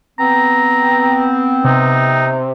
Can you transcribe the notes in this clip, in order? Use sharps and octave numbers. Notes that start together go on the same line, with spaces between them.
B3 C4 A#5
C3 D#4